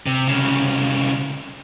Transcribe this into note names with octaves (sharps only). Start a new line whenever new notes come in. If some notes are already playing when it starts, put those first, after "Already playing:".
C3
C2 C#3